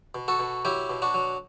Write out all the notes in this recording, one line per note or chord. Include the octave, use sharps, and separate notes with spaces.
B2
F#4 A4
B2
F#3 E4 G4
B2
D4 F#4
F#3